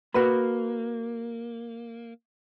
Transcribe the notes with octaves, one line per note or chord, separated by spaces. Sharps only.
A#3 F#4 B4 B5